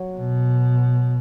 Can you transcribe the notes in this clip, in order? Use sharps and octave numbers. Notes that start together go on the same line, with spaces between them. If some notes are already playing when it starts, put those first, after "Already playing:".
Already playing: F#3
B2